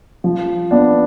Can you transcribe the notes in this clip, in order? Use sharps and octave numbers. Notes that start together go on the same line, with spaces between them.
F3
B3 D4